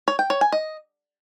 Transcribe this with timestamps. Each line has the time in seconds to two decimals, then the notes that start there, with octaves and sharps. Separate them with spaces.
0.08 C#5
0.19 G5
0.30 C#5
0.41 G#5
0.52 D#5